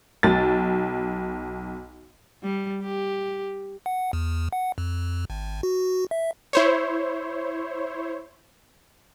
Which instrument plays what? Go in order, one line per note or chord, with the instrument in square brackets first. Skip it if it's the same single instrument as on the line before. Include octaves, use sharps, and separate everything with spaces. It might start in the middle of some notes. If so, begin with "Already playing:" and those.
[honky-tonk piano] B1 A6
[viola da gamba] G3
G4
[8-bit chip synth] F#5
E2
F#5
F2
G#1
F#4
E5
[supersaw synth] E4 C5 C#5